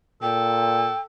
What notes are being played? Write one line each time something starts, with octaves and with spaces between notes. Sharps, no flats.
A#2 A4 G5